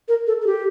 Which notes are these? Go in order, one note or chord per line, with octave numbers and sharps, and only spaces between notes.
A#4
A4
A4
G4